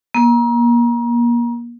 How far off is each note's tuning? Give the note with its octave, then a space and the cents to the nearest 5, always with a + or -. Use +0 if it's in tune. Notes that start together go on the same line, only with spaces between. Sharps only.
A#3 +30